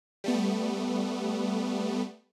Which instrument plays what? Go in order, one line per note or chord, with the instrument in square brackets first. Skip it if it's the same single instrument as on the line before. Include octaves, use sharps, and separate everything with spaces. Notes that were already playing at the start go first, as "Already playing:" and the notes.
[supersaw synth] G3 A3 B3